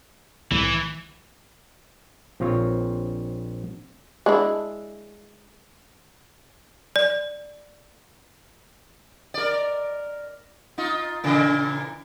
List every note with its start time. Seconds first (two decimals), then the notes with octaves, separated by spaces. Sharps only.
0.51 C2 A2 E3
2.40 A#1 C4 F4 C#5
4.26 G#3 D4 E4
6.96 D5
9.34 A#4 D5
10.78 D#4 F4
11.24 A#2 C#3 E3